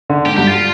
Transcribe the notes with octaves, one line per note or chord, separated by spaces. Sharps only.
D3
G#2 G4
G2 G4
F4